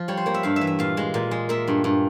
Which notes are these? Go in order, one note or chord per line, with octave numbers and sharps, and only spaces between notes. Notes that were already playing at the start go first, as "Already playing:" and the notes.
Already playing: F3
G3 C#5
C5
A#3 C#5
E5
G2 F5
E5
E3
E5
A#2 F5
G#3
A#2
G#3
A#3 E5
G2
G2